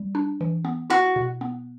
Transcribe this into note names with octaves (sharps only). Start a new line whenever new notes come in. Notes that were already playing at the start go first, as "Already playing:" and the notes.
Already playing: G3
D4
E3
B3
E4 F#4
B2
B3